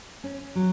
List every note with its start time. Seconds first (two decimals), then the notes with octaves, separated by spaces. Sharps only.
0.24 C#4
0.55 F#3